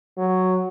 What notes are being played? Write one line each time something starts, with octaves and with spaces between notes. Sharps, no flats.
F#3